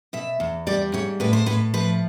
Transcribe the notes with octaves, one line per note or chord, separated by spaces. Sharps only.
B2 E5
E2
G3 D5
G#2 C#5
A2 B4
C5
A2 B4
F3 B4